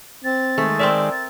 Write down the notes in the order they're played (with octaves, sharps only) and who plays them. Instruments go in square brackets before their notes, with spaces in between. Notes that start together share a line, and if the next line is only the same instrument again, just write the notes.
[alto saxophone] C4 [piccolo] A6
[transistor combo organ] D#3 G#3 [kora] A3
[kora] C4 A#4 E5 [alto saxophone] D5
[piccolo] A6